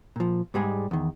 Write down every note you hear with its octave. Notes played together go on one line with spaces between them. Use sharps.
A#2 F3
G#2 G3 G#3 G#4
E2 D#3